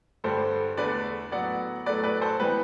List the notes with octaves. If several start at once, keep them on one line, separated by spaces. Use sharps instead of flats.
G2 D3 G3 A4 C5
E2 D3 A3 B4 D5
A2 F#3 B3 D5 F#5
A2 F#3 A3 B4 D5
B4 D5
A4 C5
E3 G3 B3 B4